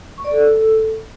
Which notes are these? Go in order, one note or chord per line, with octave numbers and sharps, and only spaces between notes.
C#6
D5
A4